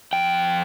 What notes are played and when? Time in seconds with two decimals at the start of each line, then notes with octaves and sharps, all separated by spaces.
0.13 F2 G5